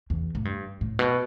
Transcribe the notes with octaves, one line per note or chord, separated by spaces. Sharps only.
E2
A2
G2
A2
B2